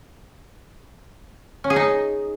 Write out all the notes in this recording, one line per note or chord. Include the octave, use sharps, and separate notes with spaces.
C#4
G#4
D#4